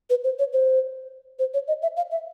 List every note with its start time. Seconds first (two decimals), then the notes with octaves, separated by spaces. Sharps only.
0.10 B4
0.24 C5
0.39 C#5
0.53 C5
1.39 C5
1.54 C#5
1.68 D#5
1.82 E5
1.97 F5
2.11 E5